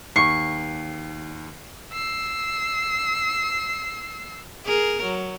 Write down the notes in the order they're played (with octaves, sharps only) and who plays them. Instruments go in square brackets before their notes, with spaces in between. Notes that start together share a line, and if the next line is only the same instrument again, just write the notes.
[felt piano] D#2 [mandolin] C#6 [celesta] C7
[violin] E6 C7
[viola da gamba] G#4 A#4
F#3